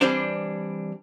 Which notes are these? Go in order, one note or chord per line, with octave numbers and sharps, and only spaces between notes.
E3 G3 C4 D4